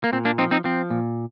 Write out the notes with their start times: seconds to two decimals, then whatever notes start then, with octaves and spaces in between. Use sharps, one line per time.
0.04 A#3
0.13 A#2 C4
0.25 A#3 D4
0.38 F3 C4 D#4
0.51 C4 D#4
0.64 F3 C4
0.90 A#2